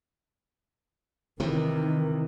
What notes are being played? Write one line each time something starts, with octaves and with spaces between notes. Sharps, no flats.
C3 D#3 E3